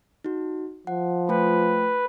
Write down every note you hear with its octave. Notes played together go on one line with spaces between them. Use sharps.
D#4 F#4
F3 F#5
A3 F4 B4 G5